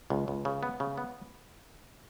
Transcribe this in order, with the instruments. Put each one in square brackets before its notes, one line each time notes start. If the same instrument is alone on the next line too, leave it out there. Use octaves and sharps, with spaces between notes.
[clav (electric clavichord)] C#2
C#2
C#3
B3
C#3
B3